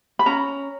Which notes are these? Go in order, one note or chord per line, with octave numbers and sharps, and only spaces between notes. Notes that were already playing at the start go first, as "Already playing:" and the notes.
B5
C#4 A#5